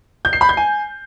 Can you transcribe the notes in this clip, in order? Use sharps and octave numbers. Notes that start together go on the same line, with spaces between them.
G6
C7
B5
G6
G#5